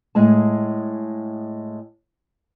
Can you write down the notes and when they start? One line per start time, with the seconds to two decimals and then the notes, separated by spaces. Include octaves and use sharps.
0.15 A2 G#3 G#4 A5